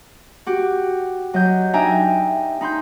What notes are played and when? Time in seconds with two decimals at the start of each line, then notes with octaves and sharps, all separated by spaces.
0.47 F#4 G4
1.34 F#3 D#5 G6
1.73 D4 D#4 E5 G5 G#5 A#5
2.61 D#4 B5 C6 G6